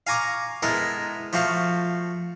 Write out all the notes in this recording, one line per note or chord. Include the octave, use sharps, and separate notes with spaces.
F5 G#5 A#5 C#6 D6
G#3 B3 E4 A4 A#4
F3 A3 F#4 F5